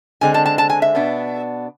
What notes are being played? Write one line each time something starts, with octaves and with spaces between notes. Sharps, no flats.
D3 G#3 C4 G#5
A5
A5
A5
G#5
E5
B2 B3 D4